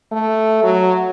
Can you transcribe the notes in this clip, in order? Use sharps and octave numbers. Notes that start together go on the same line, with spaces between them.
A3
F#3